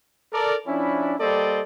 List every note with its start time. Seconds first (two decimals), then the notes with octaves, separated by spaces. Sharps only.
0.33 A4 A#4 D5
0.67 F3 C#4 D4 E4
1.20 G3 A#3 A4 C5 D5 D#5